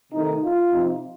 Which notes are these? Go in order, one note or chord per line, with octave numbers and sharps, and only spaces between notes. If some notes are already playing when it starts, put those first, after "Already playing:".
C3 D#3 A3 D#4
F4
C3 F3 C4 D#4